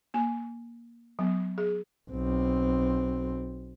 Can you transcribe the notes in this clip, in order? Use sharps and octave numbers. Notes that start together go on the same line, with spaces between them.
A#3 G#5
F#3 B3
G#4
B1 C4